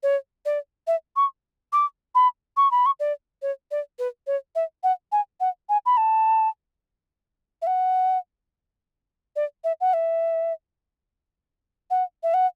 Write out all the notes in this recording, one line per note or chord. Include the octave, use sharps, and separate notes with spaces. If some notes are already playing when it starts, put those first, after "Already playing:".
C#5
D5
E5
C#6
D6
B5
C#6
B5
C#6
D5
C#5
D5
B4
C#5
E5
F#5
G#5
F#5
G#5
B5
A5
E5
F#5
D5
E5
F#5
E5
F#5
E5
F#5